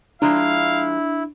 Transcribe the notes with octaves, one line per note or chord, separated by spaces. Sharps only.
F3 G#3 D4 E4 F5 A#5